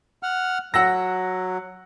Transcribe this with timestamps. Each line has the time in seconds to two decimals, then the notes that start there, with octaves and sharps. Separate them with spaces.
0.23 F#5 F6
0.74 F#3 F#5 E6 A#6